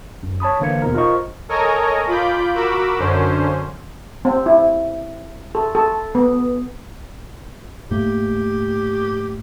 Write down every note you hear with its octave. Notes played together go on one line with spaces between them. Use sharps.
F#2
C#5 A5 B5 D#6
D3 E3 A#3 C5 G#6 C#7
E2 B2 D#4 A#4
F4 A#4 C5 D#5 C#6
A4 A#4 C#5 D#5 G#5 A#5
F4 B5 D6 G6
F#4 A#4 B5 D6 E6
F#2 D3 C#4 C5
C4
E4
A4
A4
B3
G#2 A3 A#3 G4